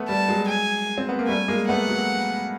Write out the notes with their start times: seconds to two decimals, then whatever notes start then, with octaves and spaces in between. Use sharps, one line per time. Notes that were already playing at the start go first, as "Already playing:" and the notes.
Already playing: A3 B3
0.09 G3 A5
0.28 F#3 G#3
0.49 G#5
0.98 C4
1.09 B3
1.19 A#3
1.28 G3 A3 G#5
1.48 G#3 A#3
1.68 A3 B3 F#5
1.89 F#3